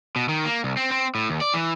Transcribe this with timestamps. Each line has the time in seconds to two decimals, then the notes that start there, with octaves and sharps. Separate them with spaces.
0.16 B2
0.29 D#3
0.45 A#3
0.64 C2
0.77 C4
0.91 C4
1.15 A2
1.30 D#2
1.41 D5
1.54 E3